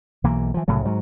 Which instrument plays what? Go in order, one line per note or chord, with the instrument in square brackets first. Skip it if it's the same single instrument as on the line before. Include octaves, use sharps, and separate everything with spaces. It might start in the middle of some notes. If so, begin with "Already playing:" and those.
[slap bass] B1 E3 A#3
E3 F3
C2 A2 C#3 F#3
G#2 F#3